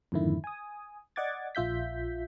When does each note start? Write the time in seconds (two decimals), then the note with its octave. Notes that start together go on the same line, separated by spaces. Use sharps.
0.12 F2 G#2 D3 D#3 E4
0.44 G#5 D#6
1.16 D5 D#5 F#5 D6 G#6 A6
1.55 A#1 F4 E5 G6 B6